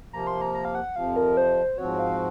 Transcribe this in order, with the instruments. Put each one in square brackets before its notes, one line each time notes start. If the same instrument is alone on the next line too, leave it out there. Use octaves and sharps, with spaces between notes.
[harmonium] C3 F3 A#3 [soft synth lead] A#5
[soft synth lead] C6
A#5
A#5
F5
F#5
[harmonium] F2 C3 F3 [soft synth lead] F5
[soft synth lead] A#4
C5
[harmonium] G#2 F3 C4 F#4 [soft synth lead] C#5
[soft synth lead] F5